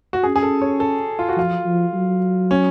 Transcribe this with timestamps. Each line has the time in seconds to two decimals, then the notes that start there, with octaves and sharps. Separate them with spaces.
0.13 F#4
0.23 C#4 G#4
0.36 G#4
0.43 A4
0.62 C#5
0.80 A4
1.19 F4
1.29 F#4
1.36 F3 F4
1.65 F3
1.94 F#3
2.51 C#4